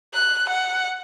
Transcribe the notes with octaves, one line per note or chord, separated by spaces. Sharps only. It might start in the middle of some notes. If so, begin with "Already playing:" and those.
F#6
F#5